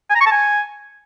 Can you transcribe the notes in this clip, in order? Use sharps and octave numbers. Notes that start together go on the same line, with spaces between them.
G#5
A#5
C#6
A5
G#5